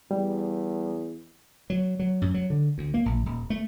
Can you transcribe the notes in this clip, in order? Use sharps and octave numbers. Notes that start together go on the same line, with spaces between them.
E2 G3
F#3
F#3
F#2
F#3
D3
D2
A#3
A#1
D#1
A3